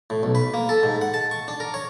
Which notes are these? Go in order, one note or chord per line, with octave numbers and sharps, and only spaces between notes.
A2
B1
B4
A#3
A4
G#2
F#5
A5
C#6
D4
A#4
C#5